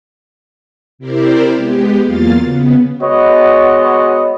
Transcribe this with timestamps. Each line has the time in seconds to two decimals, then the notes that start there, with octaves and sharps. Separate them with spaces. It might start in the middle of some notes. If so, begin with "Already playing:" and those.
0.99 C3 E4 G4 A#4 C5 D5
1.56 G#3 B3 G4
2.04 E2 F#3 A#3 F4 F5 A6
2.43 C#3 B3
3.02 G#3 B3 F#4 C#5 D#5